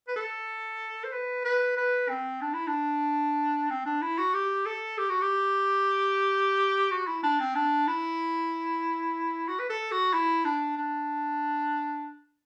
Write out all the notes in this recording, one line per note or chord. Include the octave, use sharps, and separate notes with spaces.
B4
A4
C5
B4
B4
B4
C4
D4
E4
D4
C4
D4
E4
F#4
G4
A4
G4
F#4
G4
F#4
E4
D4
C4
D4
E4
F#4
B4
A4
F#4
E4
D4
D4